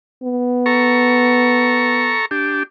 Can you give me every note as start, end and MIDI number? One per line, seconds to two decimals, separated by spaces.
0.23 2.18 59
0.66 2.26 69
0.66 2.26 82
0.66 2.26 85
2.31 2.63 62
2.31 2.63 67